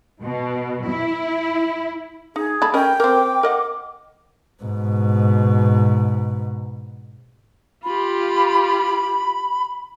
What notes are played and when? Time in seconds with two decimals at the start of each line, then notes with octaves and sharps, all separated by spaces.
0.23 B2
0.90 E4
2.36 D#4 G#4
2.62 A3 A5 B5
2.74 C#4 A#4 D#5 G5
3.00 C4 A#4 D6
3.43 A#4 D#5 F#5
4.63 G#2 B2
7.84 F4 G4 B5